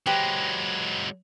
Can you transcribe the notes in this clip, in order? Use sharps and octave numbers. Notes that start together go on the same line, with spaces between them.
F#3 G#3 G4 B4 C5